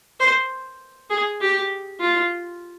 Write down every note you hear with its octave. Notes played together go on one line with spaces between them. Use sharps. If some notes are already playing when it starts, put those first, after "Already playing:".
C5
G#4
G4
F4